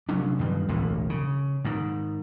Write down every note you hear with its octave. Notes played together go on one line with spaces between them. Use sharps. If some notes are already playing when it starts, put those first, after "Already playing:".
F1 F#3 C#4 D4
G2 D#3 G3
E1 A1 D2 A2
C#3
G#2 D#3